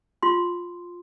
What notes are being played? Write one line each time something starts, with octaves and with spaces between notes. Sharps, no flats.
F4 C6